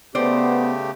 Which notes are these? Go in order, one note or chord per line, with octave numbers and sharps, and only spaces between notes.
C#3 A3 B3 G4 C5 D5